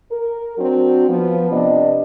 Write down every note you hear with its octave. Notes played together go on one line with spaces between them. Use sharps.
A#4
F#3 C4 D4 F#4
F3 B3
C3 B3 D4 D5 D#5